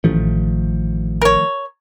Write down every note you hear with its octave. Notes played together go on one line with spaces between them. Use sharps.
A1 D#3 F3 A3
A#4 C#5